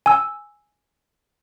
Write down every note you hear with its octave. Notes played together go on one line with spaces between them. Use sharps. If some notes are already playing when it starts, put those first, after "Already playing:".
G#5 E6